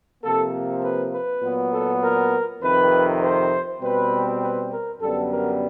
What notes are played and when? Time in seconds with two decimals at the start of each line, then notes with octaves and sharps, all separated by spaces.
0.24 C3 F3 A#3 A4
0.83 B4
1.13 B4
1.43 A#2 F#3 B3
1.73 A4
2.03 A#4
2.62 F2 C3 D#3 B4
3.23 C5
3.82 B2 G3 C4 B4
4.42 B4
4.72 A#4
5.01 F#2 D3 G3 B3 A4
5.31 A#4